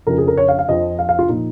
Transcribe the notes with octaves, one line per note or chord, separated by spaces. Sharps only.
F2 C#3 F3 A#4
G#4
A#4
C#5
F5
F5
F2 F3 D#5
F5
F5
F4
A#2 F3 D#4